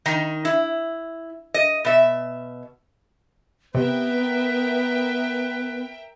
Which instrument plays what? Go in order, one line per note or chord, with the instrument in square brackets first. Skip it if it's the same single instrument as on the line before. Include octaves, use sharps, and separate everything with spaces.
[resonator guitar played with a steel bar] D#3 D#4
E4
D#5
B2 E5
[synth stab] C3 [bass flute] B3 [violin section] A#4 E5 G5 [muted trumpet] B4